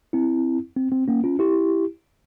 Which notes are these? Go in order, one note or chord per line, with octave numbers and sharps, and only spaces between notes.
C4 E4
C4
C4
A#3 C#4
C#4 F4
E4 G4